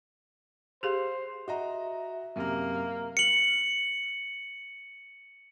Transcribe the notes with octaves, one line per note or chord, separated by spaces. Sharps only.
G4 G#4 C5 F5
F#4 D#5 E5 A#5
F#2 C3 A#3 F6
C#7 F#7